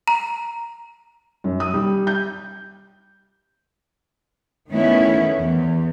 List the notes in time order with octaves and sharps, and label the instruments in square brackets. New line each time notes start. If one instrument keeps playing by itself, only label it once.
[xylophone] A#5
[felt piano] F#2
D#6
G3
G6
[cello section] D#3 A3 B3 C#4 E4
E2